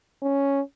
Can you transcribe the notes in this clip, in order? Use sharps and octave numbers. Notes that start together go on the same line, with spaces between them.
C#4